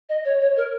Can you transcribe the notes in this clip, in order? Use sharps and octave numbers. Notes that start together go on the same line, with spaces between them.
D#5
C#5
C#5
A#4